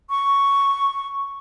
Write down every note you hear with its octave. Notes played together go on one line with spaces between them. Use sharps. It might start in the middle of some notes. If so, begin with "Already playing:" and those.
C#6